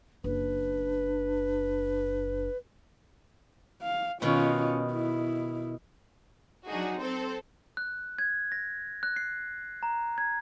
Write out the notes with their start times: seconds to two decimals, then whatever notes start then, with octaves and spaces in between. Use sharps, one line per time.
0.24 F#1 D4 B4
3.82 F5
4.22 B2 D#3 C#4 F4
4.92 E4
6.69 F#3 D4 D#4 F#4 G#4
6.99 C4 A4 C5
7.77 F#6
8.19 G#6
8.52 A#6
9.03 F#6
9.16 C7
9.83 A#5
10.18 G#6